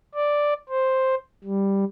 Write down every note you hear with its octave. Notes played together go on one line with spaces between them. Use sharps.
D5
C5
G3